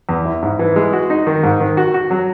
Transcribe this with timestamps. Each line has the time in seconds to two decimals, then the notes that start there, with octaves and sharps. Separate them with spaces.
0.09 E2
0.25 E4
0.42 G#2
0.59 E3
0.76 G#3
0.93 F#4
1.10 D#4
1.27 D#3
1.43 G#2
1.60 D#3
1.77 F#4
1.94 F#4
2.10 F#3